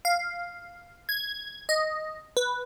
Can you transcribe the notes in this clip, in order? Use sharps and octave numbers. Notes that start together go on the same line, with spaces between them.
F5
G#6
D#5
B4